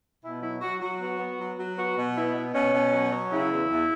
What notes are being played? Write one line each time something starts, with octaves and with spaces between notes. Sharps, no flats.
B2 E4
F#3 E4
F#3 F#4
F#3 F#4
B3 F#4
B3
F#3
F#3
B3 F#4
B2
B3 E4
B2
B2 C#4
B2
F#3
F#3
C#3 E4
E2
E2